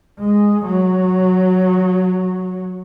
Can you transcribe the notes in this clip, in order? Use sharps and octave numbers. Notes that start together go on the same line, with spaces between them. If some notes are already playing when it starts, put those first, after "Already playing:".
G#3
F#3